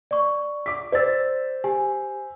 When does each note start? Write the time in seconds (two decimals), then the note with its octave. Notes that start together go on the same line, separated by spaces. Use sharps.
0.11 D5 C#6
0.66 D6 B6
0.92 C5 D5 E6 A6
1.64 G4 G#5